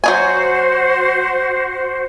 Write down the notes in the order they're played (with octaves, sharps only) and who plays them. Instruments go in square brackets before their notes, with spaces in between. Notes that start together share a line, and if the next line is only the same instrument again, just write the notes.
[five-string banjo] F#3 D#4 G#5 [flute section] F#4 C5